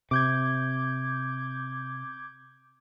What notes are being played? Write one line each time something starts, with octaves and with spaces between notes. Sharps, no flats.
C3 D6 G6 G#6